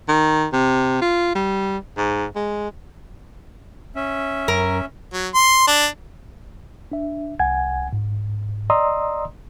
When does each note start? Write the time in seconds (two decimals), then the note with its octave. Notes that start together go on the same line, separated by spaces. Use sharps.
0.08 D#3
0.53 C3
1.01 F4
1.35 G3
1.97 G#2
2.35 G#3
3.96 C#4 E5
4.48 F#2 A#4
5.13 F#3
5.34 C6
5.67 D4
6.92 D4 E5
7.39 C2 F#5 G#5 G#6
7.93 G#2
8.70 D5 D#5 A#5 C6 D#6 E6